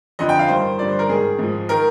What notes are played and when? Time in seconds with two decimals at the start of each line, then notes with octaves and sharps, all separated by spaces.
0.19 F2 D3 F3 D#5
0.29 G5
0.39 F5
0.48 G2 D#3 C5
0.79 G2 D3 F3 D5
0.89 C5
0.99 A#4
1.09 G#2 D#3 G#4
1.39 G#2 F3
1.69 D#3 A#4